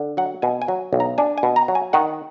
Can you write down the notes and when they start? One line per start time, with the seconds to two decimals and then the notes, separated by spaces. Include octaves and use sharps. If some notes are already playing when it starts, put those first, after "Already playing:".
Already playing: D3
0.17 F#3 F#5
0.42 B2 G#5
0.62 G#5
0.68 F#3
0.93 B1
1.00 A#5
1.18 D4 G#5
1.38 G#5
1.43 B2
1.56 A#5
1.68 F#3
1.75 G#5
1.93 D#3 F#5